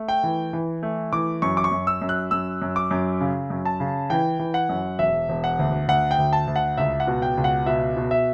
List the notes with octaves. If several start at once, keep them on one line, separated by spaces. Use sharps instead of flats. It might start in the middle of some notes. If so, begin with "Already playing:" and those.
Already playing: A3
G5
E3
E3
A3
E3 D6
F#2 C#6
D6
C#6
F#2
E6
F#2
F#6
F#2 E6
F#2
D6
F#2
C#3
F#2
A5
C#3
E3 G5
E3
F#5
F#2
E1 E5
E1
F#5
D2
D2 F#5
G5
D2
A5
D2
F#5
C#2 E5
F#5
B2
G5
C#2
F#5
B2 E5
B2
E5